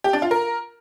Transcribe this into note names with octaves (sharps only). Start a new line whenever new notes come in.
G4
D4
F4
A#4